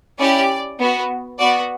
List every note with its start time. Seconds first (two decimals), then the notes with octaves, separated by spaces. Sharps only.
0.19 C#4 E4 G4 D5
0.79 B3 F#4
1.39 B3 F#4 D5